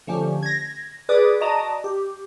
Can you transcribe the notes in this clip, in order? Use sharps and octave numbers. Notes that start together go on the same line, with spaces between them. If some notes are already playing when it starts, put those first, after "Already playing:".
D3 F3 A3 C#4 G4
G#6 A#6
G#4 B4 D5 D6 D#6
F#4 D5 D#5 A5 A#5 D#6
G4